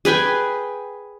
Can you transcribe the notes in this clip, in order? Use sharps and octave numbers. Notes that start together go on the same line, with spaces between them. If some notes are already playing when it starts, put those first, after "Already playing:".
G#4 B4 G5 G#5